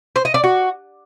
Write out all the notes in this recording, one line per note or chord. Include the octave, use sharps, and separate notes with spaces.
C5
D#5
D5
F#4